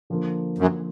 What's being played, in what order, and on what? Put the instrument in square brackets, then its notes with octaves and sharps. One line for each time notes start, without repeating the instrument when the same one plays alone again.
[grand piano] D3 F3 A#3
[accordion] F#2